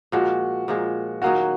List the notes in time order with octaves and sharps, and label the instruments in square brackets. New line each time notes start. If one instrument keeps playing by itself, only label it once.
[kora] A#2 F3 G#3 [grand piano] F#4
[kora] A#2 F3 G#3
[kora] D#3 F#3 A#3 C#4 [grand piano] F#4